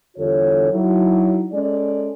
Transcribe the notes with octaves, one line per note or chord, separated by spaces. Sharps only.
E2 D3 G3 F4 A4 C#5
F#3 D#4 E4
G#3 C#4 A4 D5